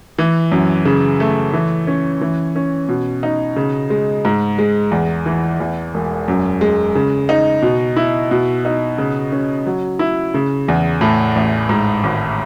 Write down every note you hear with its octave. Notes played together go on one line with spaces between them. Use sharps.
E3
F#2
C#3
A3
E3
C#4
E3
C#4
B2
D#4
C#3
G#3
G#2
G#3
E2
E3
E2
E1
F#2
G#3
C#3
D#4
B2
E4
B2
D#4
C#3
C#4
F#3
E4
C#3
E2
A2
A1
G#2
G#1